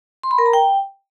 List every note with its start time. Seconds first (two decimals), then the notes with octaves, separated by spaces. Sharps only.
0.23 C6
0.31 B5
0.38 A#4
0.46 A#5
0.53 G5